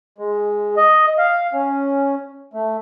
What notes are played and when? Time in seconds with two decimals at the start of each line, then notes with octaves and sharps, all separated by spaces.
0.18 G#3
0.77 D#5
1.18 F5
1.53 C#4
2.53 A3